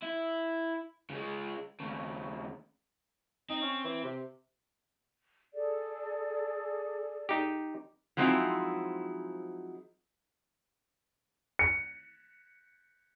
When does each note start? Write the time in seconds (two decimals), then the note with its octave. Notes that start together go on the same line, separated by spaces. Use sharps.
0.03 E4
1.10 C#3 G#3
1.80 D#2 C#3
3.50 C4 D#4
3.61 C#4
3.84 E3
4.04 C3
5.54 G#4 A4 D5
7.29 D#4 G4
8.17 F3 F#3 G#3 C4 D#4 E4
11.59 C#7